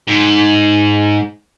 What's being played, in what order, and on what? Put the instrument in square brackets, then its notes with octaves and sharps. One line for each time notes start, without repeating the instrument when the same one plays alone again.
[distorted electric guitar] G#2